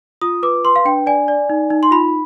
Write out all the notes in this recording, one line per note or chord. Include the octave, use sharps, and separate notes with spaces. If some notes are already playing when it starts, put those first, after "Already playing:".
F4 D#6
B4 D6
B4 C6
F5
D4 G5
D5 G#5
D5
D#4
D#4
C6
F4 B5